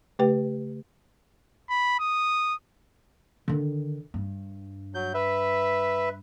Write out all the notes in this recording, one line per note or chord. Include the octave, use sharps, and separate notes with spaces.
C#3 A3 G4 B4 G5
B5
D#6
D3 D#3
G2
F#3 G6
B4 E5